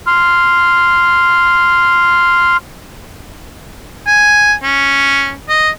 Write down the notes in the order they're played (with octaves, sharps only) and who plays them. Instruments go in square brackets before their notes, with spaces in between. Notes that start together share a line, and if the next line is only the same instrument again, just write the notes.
[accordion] C6 F6
[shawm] G#5
C#4
D#5